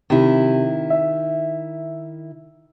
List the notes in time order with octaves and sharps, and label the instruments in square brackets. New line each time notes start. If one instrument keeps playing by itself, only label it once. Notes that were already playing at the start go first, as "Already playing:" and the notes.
[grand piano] C3 [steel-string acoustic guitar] D#3 E4
[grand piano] E5